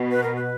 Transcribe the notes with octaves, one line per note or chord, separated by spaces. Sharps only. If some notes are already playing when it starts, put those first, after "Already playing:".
Already playing: B2
B4
A#4
B4